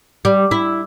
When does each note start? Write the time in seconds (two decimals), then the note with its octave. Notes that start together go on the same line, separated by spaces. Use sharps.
0.25 G3
0.51 E4